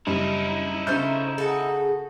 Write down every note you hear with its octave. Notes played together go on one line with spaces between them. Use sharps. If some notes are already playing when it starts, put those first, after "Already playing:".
F#1 G3 D#4 E4
C#3 A3 C#4 C5 G6
F#4 G#4 A4